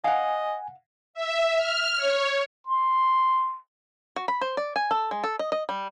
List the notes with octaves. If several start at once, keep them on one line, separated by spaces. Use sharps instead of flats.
D#5 F5 F#5 G#5
E5
F6
C#5
C6
F#4
B5
C5
D5
G#5
A4
G#3
A4
D#5
D#5
G3